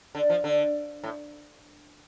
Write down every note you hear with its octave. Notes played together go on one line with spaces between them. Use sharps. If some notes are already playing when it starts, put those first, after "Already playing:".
D3
F3
D3
A2